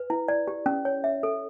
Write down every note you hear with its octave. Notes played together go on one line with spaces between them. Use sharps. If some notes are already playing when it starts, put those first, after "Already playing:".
Already playing: B4
E4
D5
G4
C#4
C#5
E5
A4